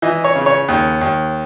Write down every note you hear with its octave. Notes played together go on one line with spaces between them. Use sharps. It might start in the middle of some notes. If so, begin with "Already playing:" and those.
E3 D#5
C#5
C#3
C#5
D#2
D#2